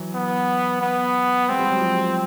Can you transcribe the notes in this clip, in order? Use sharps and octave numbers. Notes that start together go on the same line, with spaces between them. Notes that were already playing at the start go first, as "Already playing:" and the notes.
Already playing: E3 F#3
B3
B3
G#3 C4
G3
F#3
F3 G3